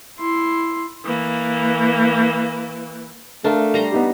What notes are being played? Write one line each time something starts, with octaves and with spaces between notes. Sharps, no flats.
E4 C6
E3 A#3
A3 D4 A4 A#4 F5
G3 A#5 C6
B3 D#4 G4